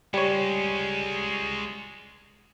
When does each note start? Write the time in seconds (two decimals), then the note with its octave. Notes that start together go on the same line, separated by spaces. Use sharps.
0.14 G3 G#3 C#4 C#5